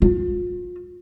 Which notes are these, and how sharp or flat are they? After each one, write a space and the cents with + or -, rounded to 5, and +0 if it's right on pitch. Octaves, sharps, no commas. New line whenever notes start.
F4 +40